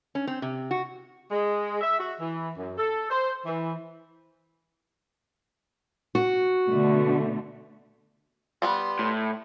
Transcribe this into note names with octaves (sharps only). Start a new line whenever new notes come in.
C#4
C4
C3
F#4
G#3
E5
F#4
E3
F#2
A4
C5
E3
F#4
B2 D3 A3
G3 B3 B4 C6
A2